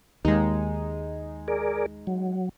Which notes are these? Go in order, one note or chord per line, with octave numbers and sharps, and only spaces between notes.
D#2 G#3 D#4
G#4 A#4 D5
F#3